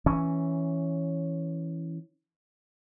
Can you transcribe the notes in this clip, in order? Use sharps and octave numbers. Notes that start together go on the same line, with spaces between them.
E3 C#4